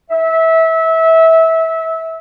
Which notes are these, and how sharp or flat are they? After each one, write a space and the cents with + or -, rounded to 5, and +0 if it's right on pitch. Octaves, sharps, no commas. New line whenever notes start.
E5 -20